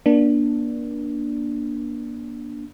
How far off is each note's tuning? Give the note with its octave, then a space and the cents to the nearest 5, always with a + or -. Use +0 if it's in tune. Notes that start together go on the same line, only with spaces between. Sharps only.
A#3 +40 D4 +0